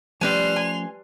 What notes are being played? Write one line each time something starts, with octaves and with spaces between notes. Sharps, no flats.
F3 G3 A3 C#4 B4 G#5 C6 F7
G#5